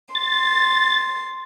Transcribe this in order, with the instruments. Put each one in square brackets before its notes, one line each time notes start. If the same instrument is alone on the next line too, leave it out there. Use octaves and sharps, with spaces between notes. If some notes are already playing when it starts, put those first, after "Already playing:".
[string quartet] C6 [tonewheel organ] A6